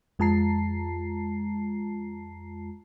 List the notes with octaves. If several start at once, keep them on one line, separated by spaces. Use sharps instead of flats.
F2 G#3 F4 A5 A#5 C7